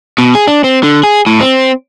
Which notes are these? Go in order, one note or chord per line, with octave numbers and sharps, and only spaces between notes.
B2
G#4
D4
C4
D3
G#4
A2
C4